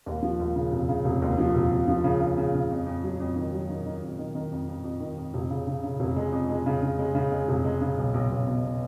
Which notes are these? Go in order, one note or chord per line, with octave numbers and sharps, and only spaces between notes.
D#2
F3
D#2
C#3
F1
C#3
F1
D#2
F3
F1
F1
F3
C#3
C#3
C#3
C#3
F2
F2
F#3
F2
D#3
F#3
D#3
D#3
F2
D#3
D#3
F2
F2
F2
D#3
F2
F1
C#3
C#3
C#3
F1
G#3
F2
G#3
C#3
C#3
G#3
C#3
G#3
F1
G#3
C#3
B1
B1
B1
B2
B2